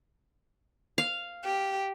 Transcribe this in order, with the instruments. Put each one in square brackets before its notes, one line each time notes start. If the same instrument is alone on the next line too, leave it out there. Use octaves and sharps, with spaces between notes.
[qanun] F5
[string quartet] G4